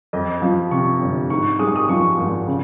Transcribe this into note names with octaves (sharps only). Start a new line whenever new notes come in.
F2 D#5
F3
C3 C#6
G1
G#2 C#6
G#3 D#6
C#6
D#6
F3 C#6
G#1
C#3